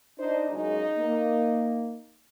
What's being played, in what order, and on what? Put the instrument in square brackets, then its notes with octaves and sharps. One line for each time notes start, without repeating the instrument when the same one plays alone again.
[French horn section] D4 D#4 [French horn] C5
[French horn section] F#2 C#3 G#3 [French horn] D#4
[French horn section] A#3